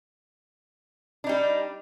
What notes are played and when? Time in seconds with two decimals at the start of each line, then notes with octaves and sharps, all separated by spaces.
1.24 D4
1.27 D#4
1.29 G3